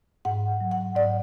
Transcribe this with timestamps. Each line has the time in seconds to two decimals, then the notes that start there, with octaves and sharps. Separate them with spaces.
0.25 G#2 F#5
0.61 F#3
0.71 F#5
0.95 G#2 D5